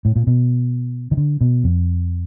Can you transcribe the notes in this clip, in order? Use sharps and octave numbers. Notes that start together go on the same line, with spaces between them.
A2
A#2
B2
D#3
D3
B2
F2